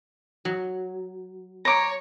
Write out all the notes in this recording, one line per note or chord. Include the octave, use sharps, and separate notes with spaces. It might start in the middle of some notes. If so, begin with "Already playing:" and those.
F#3
C#5 A#5 D6